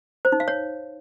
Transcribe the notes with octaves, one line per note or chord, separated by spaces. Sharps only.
C5
D#4
F5
C#5